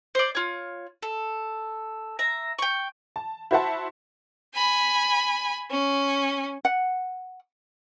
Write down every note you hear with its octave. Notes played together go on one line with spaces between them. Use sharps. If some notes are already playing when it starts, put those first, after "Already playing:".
C5 D5
F4 C#5
A4
E5 A#5
G5 C#6
A5
E4 F#4 C5 E5 F#5 A5
G#5 B5
C#4
F#5